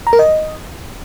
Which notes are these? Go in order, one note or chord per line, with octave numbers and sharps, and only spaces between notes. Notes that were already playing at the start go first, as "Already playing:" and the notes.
A#5
A#4
D#5